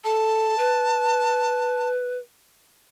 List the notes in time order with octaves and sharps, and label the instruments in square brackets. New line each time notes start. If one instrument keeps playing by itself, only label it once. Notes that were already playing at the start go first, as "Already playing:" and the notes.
[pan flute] A4 [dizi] A5
[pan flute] B4